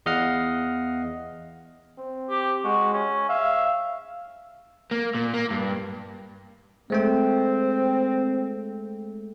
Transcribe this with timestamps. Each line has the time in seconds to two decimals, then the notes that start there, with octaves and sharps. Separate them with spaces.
0.06 E2 D#5 F5 F#5 F6 C7
1.98 C4
2.30 G4
2.64 G#3 F#4
2.94 C#4
3.29 E5 F5
4.91 A#3
5.15 A#2
5.34 A#3
5.50 G2
6.90 G#3 A3 C4 G5